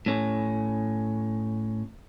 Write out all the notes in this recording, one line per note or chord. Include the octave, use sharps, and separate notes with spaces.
A2 C#4